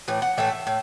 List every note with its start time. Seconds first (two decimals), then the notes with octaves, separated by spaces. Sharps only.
0.08 A2 E3
0.22 F#5
0.37 A2 E3 A3 E5
0.67 A2